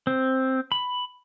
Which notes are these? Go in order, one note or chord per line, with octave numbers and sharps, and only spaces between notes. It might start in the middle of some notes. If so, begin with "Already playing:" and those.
C4
B5